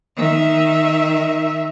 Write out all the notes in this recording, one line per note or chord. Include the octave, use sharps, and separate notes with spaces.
D#3 E5